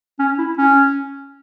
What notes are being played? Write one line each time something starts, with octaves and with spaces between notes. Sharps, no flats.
C#4
E4
C#4